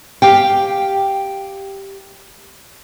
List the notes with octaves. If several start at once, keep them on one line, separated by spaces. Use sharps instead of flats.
G4 F5 G5